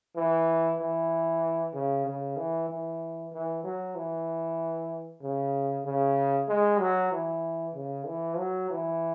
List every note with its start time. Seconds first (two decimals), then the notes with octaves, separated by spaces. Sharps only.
0.16 E3
0.79 E3
1.74 C#3
2.06 C#3
2.37 E3
2.69 E3
3.32 E3
3.64 F#3
3.95 E3
5.22 C#3
5.85 C#3
6.48 G#3
6.80 F#3
7.12 E3
7.75 C#3
8.06 E3
8.38 F#3
8.70 E3